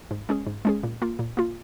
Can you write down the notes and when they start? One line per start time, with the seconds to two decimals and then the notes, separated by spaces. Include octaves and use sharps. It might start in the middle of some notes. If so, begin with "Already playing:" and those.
0.11 G#2
0.29 G#3 C#4 G#4
0.46 G#2
0.65 G#3 C#4 G#4
0.83 A#2
1.02 A#3 F4
1.19 A#2
1.37 A#3 F4